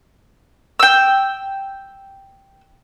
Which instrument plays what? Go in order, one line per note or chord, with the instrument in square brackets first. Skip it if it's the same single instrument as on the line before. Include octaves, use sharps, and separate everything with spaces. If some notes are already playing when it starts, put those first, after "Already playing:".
[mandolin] G5 E6